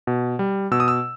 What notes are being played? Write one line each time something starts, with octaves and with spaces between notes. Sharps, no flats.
B2
G3
B2 E6
D#6
E6